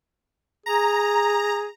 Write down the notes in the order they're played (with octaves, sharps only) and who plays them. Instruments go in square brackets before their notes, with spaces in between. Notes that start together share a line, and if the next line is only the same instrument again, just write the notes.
[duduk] G#4 [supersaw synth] A#5